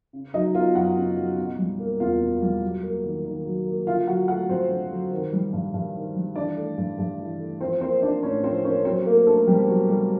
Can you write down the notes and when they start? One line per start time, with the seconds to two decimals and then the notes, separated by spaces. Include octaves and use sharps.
0.13 C#3
0.34 F#3 D#4 D#5
0.54 B3 F4 F5
0.75 F#2 F#4 F#5
0.96 C#3
1.17 F#3
1.38 B2
1.58 G3
1.80 A#3
2.00 E2 F4 F5
2.21 B2
2.42 G3
2.63 F#3
2.83 A#3
3.04 D#3
3.25 D#3
3.46 F#3
3.66 A#3
3.87 D3 F4 F5
4.07 F#3 F#4 F#5
4.28 A3 F#4 F#5
4.49 G2 C4 C5
4.70 D3
4.90 F#3
5.12 D#3
5.33 G3
5.53 G2
5.74 G2
5.95 D#3
6.15 G3
6.36 E3 D4 D5
6.57 A3
6.78 G2
6.99 G2
7.19 E3
7.40 A3
7.61 F3 C4 C5
7.81 A#3 C4 C5
8.02 D4 D#4 D5
8.23 A2 C#4 C#5
8.43 F3 C4 C5
8.64 A#3 C#4 C#5
8.85 F#3 C4 C5
9.06 A3 A#3 A#4
9.27 A3 D4 A4
9.47 B2 G3 G4
9.68 F#3 F#4
9.89 G3 A3 G4